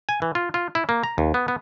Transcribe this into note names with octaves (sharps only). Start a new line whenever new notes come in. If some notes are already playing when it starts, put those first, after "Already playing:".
G#5
E3
F4
F4
E4
A#3
A#5
D#2
B3
B3